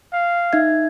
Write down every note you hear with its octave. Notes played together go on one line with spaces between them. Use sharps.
F5
D#4 E5 G#6